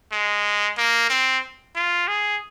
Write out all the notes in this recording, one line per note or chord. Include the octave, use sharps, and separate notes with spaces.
G#3
A#3
C4
F4
G#4